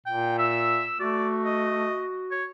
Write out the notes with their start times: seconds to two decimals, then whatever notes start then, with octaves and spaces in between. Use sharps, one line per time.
0.06 A#2 G5
0.39 E5 E6
1.00 A3 F#4 D5
1.45 D#5
2.31 C#5